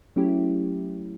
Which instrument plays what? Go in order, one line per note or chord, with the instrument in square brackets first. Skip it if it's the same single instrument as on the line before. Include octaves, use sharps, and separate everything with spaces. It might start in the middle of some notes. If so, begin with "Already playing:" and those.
[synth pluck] F#3 A3 C#4 E4 G4